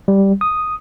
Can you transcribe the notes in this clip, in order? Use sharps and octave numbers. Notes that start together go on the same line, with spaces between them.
G3
D#6